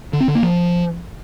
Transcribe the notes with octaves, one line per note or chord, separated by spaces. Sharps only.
D3
C4
D3
A#3
F3